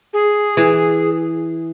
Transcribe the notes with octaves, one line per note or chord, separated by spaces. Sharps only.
G#4
E3